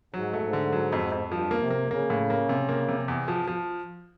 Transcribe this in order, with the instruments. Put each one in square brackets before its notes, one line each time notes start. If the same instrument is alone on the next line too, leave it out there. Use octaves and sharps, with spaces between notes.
[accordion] G#2 [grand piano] F#3
[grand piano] A3
[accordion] G#2
[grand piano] D3
F#3
F2
F2
[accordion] G2 [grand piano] F3
[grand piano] A#3
[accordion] C3
[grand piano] A#3
[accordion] C#3 [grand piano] A#3
[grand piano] A2
A#3
C3
A#3
C3
E2
F3
F3